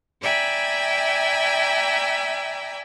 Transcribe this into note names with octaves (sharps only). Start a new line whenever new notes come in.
D5 E5 G5 G#5 A#5 B5